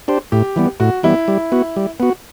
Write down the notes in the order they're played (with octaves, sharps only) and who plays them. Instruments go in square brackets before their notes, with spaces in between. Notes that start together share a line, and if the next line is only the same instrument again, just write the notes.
[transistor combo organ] D4 G4 C5
[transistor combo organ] A2 [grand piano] G4
[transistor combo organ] E3 G3 B3
[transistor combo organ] A2 [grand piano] F#4
[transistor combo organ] E3 G3 B3 [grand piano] E4
[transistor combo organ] G3
B3 F#4
G3
B3 F#4